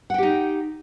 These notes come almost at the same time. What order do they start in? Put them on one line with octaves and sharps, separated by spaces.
F#5 G5 G4 D#4